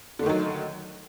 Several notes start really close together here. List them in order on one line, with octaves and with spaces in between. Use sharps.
D3 A3 D#3 F#3